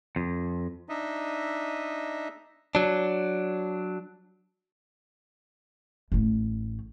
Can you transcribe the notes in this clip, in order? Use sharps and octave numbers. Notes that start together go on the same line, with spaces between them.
F2
D4 D#4 D#5 E5
F#3 D4
A1 A3